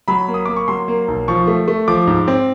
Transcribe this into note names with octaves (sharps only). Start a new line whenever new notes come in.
F#3 B5
A#3
D#6
A#3 D6
C#6
F#3 C6
A#3
B1
F3 C#6
A3
A3
F3 D6
G#2
C4